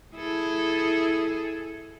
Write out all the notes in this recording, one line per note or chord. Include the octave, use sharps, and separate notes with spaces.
E4 G#4 A4